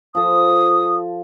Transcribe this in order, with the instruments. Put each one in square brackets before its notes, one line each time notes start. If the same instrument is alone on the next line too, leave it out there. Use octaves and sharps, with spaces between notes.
[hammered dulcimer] F3 A4 [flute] D#6